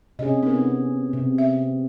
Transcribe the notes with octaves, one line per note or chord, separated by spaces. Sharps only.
C3 C#4 G#4 D#5
B3 D#4 A#4
C3
E5